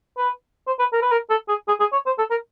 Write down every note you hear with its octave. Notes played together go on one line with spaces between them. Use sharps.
B4
C5
B4
A#4
B4
A#4
A4
G#4
G#4
G#4
C#5
C5
A4
A#4